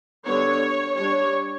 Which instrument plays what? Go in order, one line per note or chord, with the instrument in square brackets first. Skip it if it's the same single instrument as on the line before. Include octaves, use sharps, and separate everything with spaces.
[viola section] D3 G3 B3 D4 C#5
G3 D4 C#5